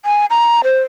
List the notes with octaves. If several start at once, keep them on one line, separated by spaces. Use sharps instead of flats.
G#5
A#5
C5